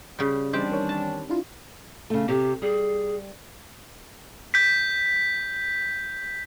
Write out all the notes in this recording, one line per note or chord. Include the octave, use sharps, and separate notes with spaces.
C#3 G3
E3 G3 C4 D4 D#4 G4
D#3 C#5 G5
A5
D4 E4 F4
C#3 A3
C3 G4
G3 G#4
G6 B6